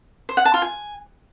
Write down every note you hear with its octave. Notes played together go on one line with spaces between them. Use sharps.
C5
F#5
A5
F4
G#5